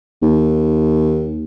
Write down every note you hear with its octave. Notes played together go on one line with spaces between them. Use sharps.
D#2